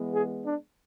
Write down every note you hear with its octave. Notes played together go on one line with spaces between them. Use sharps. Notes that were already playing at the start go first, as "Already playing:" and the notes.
Already playing: E3 G#3 B3
G#4
D4